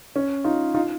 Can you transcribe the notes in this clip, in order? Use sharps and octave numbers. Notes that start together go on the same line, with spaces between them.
C#4
D#4 F4
D#4 F4